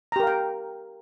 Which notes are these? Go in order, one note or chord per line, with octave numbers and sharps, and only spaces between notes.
G4 A#4 F5 G5 A#5